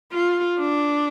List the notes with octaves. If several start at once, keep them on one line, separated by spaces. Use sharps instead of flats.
F4
D4